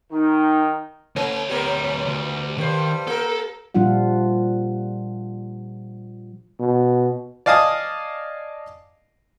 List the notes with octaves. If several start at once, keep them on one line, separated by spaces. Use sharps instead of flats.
D#3 D#4
D2 A3 C#5
G3 B3 A#4
D2
G2 D#3 G3 C5
A#3 A4 A#4
A#2 F3 G3 D4 F4 F#5
B2
D5 D#5 F5 G#5 A5 D#6